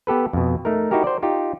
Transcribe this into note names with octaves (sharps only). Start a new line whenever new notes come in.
B3 G4 A4 B4
F2 B2
A3 D#4 A#4
D#4 E4 F#4 G4 A#4
C5 D5
D#4 F4 G4